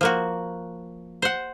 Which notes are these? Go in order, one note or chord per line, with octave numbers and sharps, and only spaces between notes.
F3 A#3 F#4
C5 F#5